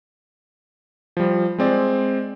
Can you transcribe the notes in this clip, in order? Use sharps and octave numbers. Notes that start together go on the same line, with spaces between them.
F3 G3
G#3 C4 D5